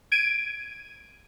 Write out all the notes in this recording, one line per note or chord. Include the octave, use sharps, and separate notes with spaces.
G#6 D7 D#7